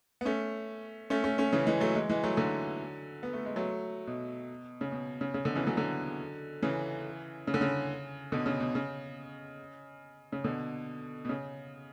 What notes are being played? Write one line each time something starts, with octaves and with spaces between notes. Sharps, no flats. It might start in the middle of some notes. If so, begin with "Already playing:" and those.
B3
A3 C#4
A3 C#4
A3 C#4
A3 C#4
C#3 E3
E3 G#3
F#3 A3
E3 G#3
E3 G#3
F#3 A3
D3 F#3
B3
A3
G#3
F#3 A3
B2
C#3
B2
C#3
C#3
B2 D3
C#3 E3
D3 F#3
D3 F#3
C#3 E3
C#3
D3
C#3
B2 D3
C#3
B2
C#3
C#3
B2 D3
B2
C#3